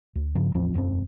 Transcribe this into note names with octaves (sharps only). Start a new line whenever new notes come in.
D2
G2 C#3 F3
A1 E2 F3 C4
E1 F#2 G#3 C4